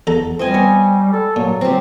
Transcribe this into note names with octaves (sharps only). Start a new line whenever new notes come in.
E2 A4 A#5
G3 C4 D#5 G#5
B3 C#5
A4
A#2 F#3
G3 C4